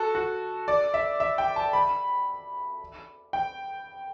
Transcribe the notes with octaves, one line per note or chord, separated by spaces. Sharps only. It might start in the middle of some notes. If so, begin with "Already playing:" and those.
Already playing: F#4 A4
F#4
D5
E5
E5
G5
A5
B5
G5